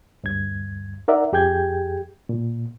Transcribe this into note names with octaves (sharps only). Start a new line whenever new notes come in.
D2 G2 G#6
D#4 A#4 D5 E5 F#5
F2 G4 G#4 G5 G6 G#6
A#2